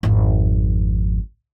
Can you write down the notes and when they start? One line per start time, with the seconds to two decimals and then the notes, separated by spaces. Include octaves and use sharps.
0.03 G#1 F2